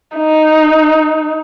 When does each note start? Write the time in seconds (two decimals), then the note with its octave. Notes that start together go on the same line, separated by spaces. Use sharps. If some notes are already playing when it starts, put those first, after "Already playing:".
0.17 D#4